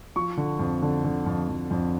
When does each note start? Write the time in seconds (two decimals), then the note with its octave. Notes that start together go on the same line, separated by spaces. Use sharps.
0.16 F3 C#6
0.37 D3
0.59 F2
0.82 D3
1.04 D3
1.26 F2
1.49 F2
1.71 F2